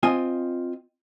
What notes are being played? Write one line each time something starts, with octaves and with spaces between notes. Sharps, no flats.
C4 F4 D#5 G#5